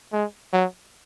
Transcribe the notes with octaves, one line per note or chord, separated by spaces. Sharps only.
G#3
F#3